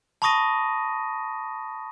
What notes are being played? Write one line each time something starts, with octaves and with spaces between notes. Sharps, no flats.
A5 B5 C#6 D#6 A#6 D#7